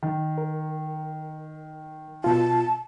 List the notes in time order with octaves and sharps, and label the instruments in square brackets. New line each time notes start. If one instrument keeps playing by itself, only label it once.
[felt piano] D#3
[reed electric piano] A#4
[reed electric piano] B2 F4 [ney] A5